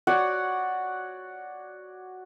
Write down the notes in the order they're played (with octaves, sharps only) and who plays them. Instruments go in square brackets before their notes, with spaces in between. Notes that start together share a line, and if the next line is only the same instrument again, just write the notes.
[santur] F#4 C#5 D5 F#5